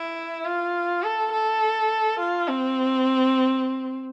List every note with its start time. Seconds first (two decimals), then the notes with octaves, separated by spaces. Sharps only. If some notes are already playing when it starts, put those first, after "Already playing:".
Already playing: E4
0.45 F4
1.03 A4
1.32 A4
2.19 F4
2.49 C4